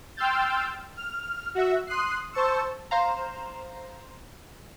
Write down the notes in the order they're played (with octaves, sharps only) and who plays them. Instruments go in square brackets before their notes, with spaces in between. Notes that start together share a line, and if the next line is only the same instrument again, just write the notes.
[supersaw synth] G5 C6 E6 F6 G6 A6
F6
F#4 E5
C6 D#6 F#6 C7
C5 A5 C#6 E6
[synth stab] C5 F5 A#5